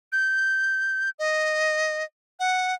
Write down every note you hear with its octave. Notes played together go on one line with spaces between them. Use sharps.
G6
D#5
F#5